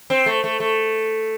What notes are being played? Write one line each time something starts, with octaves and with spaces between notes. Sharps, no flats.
C4
A3
A3
A3